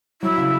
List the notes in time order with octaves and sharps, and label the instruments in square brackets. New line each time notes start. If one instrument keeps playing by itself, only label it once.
[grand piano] F#3 [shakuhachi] E4
[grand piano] C#3